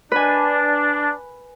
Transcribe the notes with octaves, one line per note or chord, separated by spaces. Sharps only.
D4 B4 G#5